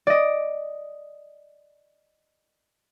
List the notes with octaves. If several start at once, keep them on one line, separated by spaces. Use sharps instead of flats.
D5 D#5